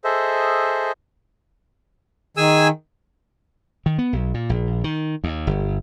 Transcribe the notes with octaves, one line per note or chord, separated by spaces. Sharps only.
G#4 A4 C5 D#5 E5
D#3 G#4 G#5 E6
D#3
B3
B1
A#2
A#1
D#3
D#2
G1